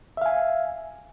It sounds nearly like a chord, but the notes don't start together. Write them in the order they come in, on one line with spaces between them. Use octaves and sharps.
E5 F5 G#5